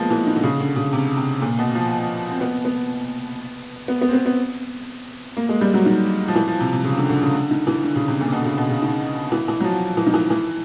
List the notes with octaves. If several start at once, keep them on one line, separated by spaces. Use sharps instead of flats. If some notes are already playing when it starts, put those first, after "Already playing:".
Already playing: F3 G#3 A#3 B3
E3
D#3
D3
C#3
D3
C#3
C3
C3
A#2
B2
F3
C4
B3
B3
B3
B3
C4
B3
B3
A#3
G#3
G3
F#3
D#3
F3
E3
F3
C3
C3
C#3
D3
D3
C#3
D3
D#3
E3
D3
C#3
C3
A#2
B2
D3
C#3
B2
C#3
D#3
E3
E3
F#3
F3
E3
D#3
E3
E3